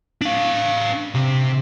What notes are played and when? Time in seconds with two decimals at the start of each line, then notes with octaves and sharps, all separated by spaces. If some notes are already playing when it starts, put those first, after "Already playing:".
0.22 D4 F5
1.15 C3